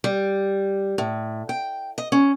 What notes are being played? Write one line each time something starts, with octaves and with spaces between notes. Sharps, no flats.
G3
A2
G5
D#5
C#4